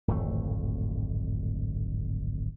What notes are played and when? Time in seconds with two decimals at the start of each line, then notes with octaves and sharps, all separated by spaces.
0.08 D1 G#1 F2 A3